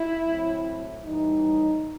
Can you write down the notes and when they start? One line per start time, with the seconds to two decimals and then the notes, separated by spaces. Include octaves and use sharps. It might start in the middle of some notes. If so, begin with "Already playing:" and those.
Already playing: E4
0.23 A2 F#3 C4
1.05 A2 E3 G3 D#4